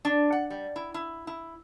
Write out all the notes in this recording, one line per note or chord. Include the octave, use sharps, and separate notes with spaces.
D4
F#5
G3
E4
E4
E4